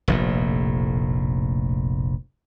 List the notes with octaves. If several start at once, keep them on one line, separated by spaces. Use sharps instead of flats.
F1 A#1 A2